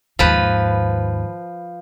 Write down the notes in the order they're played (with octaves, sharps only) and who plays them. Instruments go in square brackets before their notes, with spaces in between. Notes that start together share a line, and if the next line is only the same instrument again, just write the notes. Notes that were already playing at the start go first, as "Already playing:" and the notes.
[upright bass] D#2 G#2 [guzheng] F3 B4